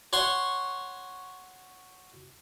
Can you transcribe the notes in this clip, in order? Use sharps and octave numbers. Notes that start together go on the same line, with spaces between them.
C#5 F#5 C6 C#6